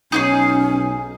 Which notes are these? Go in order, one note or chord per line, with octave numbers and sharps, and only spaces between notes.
B1 C#4 D#4 F#4 G#4